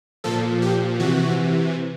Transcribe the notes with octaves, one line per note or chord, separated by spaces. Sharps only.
A#2 F3 A4
G4
C3 E3 F#4